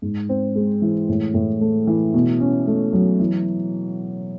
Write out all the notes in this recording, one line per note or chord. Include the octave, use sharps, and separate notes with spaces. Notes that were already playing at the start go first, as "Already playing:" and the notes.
G#2
C4
G#3
E3
A2
A2
A3
E3
B2
C#4
A3
F#3
E3